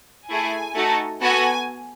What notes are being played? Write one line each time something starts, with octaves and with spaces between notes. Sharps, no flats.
A3 E4 G#4 G#5
A3 D#4 F#4 A4
B3 F#4 A4 G#5